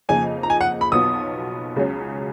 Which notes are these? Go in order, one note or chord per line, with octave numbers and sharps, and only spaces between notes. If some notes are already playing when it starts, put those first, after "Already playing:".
F2 C#3 F3 A#3 D#4 G#5
A#5
G#5
F#5
B5
B1 B2 F#3 B3 F4 D#6
C#2 C#3 F#3 C#4